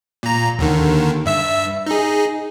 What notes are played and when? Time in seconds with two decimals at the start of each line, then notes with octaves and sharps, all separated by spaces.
0.23 A#2 A#5
0.59 D#2 D3 D#3
1.25 G2 E5 E6
1.86 D#4 G#4